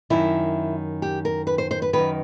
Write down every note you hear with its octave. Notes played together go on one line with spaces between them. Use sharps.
F#2 D#3 E4
G4
A#4
B4
C5
C5
B4
F#2 D#3 B4